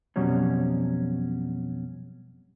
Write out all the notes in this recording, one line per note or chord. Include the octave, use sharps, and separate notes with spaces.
F2 B2 F#3 G3 C#4